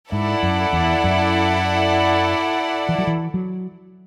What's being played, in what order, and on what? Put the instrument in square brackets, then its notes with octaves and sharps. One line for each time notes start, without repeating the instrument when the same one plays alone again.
[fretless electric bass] G#2 [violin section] E4 A4 D5 F#5
[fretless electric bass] F#2
E2
F#2
E3
F#3
E3
F#3